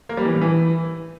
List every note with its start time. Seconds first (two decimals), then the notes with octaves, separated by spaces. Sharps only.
0.09 A#3
0.17 G3
0.25 E3
0.33 A2
0.41 E3